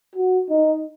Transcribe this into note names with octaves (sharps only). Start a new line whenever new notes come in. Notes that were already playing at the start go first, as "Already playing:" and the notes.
F#4
D#4